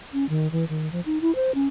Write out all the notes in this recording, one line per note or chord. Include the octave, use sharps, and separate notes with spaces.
C#4
D#3
E3
D#3
F3
D#4
E4
C5
C#4